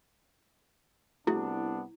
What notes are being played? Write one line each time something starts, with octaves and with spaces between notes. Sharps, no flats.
C2 A3 B3 D4 E4 F#4 G#4